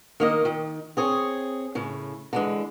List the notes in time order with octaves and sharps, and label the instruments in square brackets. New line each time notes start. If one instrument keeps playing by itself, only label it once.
[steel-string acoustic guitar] D#3 A#3 D#5
D#3
C4 G#4 C#5
A2 C#3
D3 E3 G#3